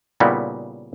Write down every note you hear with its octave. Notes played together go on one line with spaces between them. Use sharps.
A#2 C#3 G3 B3 D#4 E4